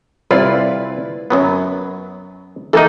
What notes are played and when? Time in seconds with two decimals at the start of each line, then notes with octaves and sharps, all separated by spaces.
0.31 C2 E4 F4 B4 D5
1.30 F#2 F#3 B3
2.73 E3 A#3 D#4 A4